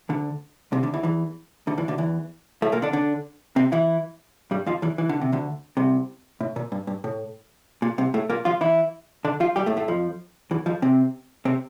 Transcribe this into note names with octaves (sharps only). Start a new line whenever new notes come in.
D2 D3
C2 C3
D2 D3
E2 E3
E2 E3
D2 D3
E2 E3
D2 D3
E2 E3
A2 A3
A#2 A#3
D3 D4
D3 D4
C3 C4
E3 E4
G2 G3
F2 F3
E2 E3
E3
D3
C3
D2 D3
C2 C3
A2
A#2
G2
G2
A2
A#2
C2 C3
A2 A3
A#2 A#3
F3 F4
E3 E4
D3 D4
F3 F4
G3 G4
A2 A3
A2 A3
F2 F3
E2 E3
F2 F3
C3 C4
C3 C4